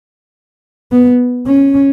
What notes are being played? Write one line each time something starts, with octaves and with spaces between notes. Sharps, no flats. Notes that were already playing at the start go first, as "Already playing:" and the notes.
B3
C#4